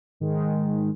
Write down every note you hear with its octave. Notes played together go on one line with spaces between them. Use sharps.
G#2 D#3 G#3